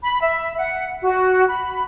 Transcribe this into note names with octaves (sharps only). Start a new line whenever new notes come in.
B5
E5
F#5
F#4
B5